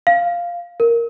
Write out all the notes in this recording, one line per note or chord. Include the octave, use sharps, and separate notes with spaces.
F5
A#4